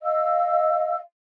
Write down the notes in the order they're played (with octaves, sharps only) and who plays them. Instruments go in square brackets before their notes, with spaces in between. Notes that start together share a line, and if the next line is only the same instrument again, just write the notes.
[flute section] D#5 F5 E6